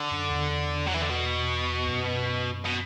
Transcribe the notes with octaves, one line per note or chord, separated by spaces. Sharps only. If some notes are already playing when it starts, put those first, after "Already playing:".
Already playing: D3
F#2
E2
F#3
E3
D3
B2
F#2
B2